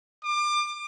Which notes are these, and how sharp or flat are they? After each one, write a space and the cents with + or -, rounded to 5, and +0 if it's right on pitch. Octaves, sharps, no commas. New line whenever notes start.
D6 +30